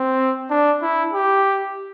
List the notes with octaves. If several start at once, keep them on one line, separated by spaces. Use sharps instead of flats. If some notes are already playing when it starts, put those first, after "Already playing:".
Already playing: C4
D4
E4
G4